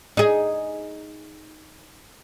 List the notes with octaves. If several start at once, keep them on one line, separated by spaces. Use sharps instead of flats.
D#4 G#4